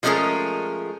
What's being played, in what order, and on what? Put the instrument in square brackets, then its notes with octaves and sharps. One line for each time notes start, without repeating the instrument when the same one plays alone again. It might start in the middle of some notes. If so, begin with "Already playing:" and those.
[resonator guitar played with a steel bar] F3 G#3 A3 C#4 G#4 A#4